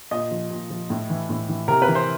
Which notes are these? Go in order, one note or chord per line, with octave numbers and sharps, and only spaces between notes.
A#2 D#5
F3
A#2
F3
A2
E3
A2
E3
C3 A#4
B4
E3
C5